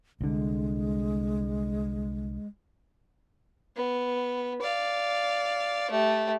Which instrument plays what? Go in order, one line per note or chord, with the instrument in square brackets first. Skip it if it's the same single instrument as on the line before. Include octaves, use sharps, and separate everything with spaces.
[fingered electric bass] C2 D3 [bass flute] G#3
[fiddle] B3
D5 F5
A3 G4